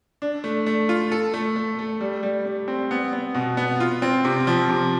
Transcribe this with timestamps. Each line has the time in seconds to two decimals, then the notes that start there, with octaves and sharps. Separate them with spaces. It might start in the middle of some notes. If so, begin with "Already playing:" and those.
0.22 D4
0.44 A3
0.67 A3
0.89 F4
1.12 A4
1.34 A3
1.56 A3
1.79 A3
2.01 G3
2.23 G3
2.45 G3
2.68 C4
2.91 B3
3.13 B3
3.35 B2
3.57 B3
3.80 F4
4.02 C4
4.25 C3
4.47 F3
4.69 C3